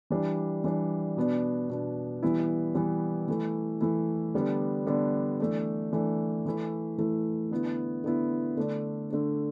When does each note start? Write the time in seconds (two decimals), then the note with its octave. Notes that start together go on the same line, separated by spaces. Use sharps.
0.10 E3 G3 D4
0.64 E3 G3 D4
1.17 B2 B3 D4
1.70 B2 B3 D4
2.23 E3 G3 B3 E4
2.75 E3 G3 B3 E4
3.28 E3 A3 E4
3.81 E3 A3 E4
4.34 D3 G3 B3 D4
4.87 D3 G3 B3 D4
5.40 E3 A3 D4
5.93 E3 A3 D4
6.46 E3 A3 E4
6.98 E3 A3 E4
7.51 D3 B3 E4
8.04 D3 B3 E4
8.57 D3 A3 D4
9.10 D3 A3 D4